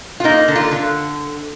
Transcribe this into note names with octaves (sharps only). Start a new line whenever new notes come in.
F4
A#3 D#4
D3
F4
D3